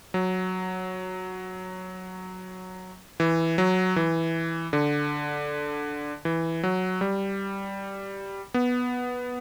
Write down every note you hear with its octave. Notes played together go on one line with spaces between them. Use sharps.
F#3
E3
F#3
E3
D3
E3
F#3
G3
B3